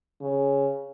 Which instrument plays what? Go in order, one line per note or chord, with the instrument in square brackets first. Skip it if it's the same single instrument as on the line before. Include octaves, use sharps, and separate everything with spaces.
[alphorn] C#3